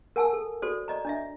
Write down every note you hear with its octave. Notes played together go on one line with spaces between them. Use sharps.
A#4 F#5 G#5 A5 E6
A4
F#4 A4 C5 D5
D5 D#5 A#5
D4 D#5 E5